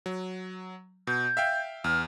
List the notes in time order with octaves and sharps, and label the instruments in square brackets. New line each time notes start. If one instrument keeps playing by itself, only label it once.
[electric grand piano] F#3
[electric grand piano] B2 [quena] G6
[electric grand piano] E5 F5 G5
[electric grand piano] E2 [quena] F6